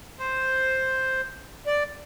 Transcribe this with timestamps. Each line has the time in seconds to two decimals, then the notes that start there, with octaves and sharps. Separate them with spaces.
0.19 C5
1.66 D5